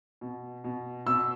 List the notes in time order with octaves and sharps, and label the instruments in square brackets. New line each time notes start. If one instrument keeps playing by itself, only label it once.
[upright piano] B2
B2
B2 E6